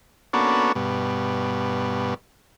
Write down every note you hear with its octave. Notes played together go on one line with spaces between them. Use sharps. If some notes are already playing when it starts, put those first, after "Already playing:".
A#3 B3 C#4 D4 F#4 A4
G2 B2